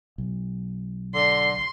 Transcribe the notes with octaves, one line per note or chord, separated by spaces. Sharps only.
B1
D3 C6